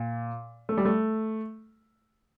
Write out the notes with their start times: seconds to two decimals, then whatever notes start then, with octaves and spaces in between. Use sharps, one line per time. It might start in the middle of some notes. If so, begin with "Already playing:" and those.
Already playing: A#2
0.69 A3
0.77 G3
0.85 A3